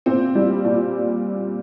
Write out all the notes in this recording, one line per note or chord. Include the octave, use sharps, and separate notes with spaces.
A#2 C4
G3
A#2